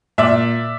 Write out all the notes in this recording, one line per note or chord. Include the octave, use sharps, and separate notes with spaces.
A#2 D5 E5